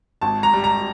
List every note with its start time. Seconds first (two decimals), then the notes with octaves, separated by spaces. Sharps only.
0.21 G#1 A5
0.43 A#5
0.53 G3
0.64 A#5